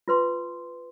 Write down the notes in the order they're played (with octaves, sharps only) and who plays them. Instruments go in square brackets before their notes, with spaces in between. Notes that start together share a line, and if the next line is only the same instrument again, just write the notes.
[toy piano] F4 B4 C6